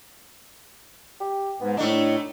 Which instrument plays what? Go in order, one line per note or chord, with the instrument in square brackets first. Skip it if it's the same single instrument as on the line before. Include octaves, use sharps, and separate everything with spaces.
[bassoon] G4
[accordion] G#2 [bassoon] B3
[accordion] A2 [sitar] A3 D4 [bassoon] D#4